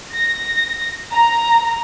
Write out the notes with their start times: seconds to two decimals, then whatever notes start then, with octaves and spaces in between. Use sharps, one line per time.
0.15 A#6
1.15 A#5